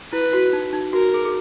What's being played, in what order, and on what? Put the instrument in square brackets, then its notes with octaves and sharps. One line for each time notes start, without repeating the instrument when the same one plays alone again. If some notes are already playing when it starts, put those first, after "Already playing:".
[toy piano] E4 [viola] B4
[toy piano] F#4
D#4
D#4
[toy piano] F#4 [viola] A#4
[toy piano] G#4
G#4